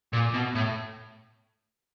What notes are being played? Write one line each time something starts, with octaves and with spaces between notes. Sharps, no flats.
A#2
B2
A2